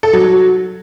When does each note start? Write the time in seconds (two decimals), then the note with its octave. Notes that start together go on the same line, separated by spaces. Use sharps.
0.03 A4
0.13 F#3
0.24 F#3